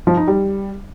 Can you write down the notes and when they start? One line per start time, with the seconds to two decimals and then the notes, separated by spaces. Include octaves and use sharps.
0.07 F3
0.17 D#4
0.28 G3